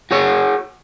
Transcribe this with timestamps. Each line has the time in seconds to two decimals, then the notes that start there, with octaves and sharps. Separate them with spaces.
0.11 F#4 G#4 C#5